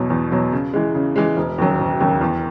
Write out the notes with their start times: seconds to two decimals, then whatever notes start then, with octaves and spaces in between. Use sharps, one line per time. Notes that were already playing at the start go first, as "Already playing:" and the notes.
Already playing: E2 B2 F#3
0.10 E2
0.32 B2 F#3
0.52 C#3
0.73 E3 G#3
0.95 C#3
1.16 E3 G#3
1.37 E1
1.58 D#2 C#3 F#3
1.79 E1
2.01 D#2 C#3 F#3
2.21 E2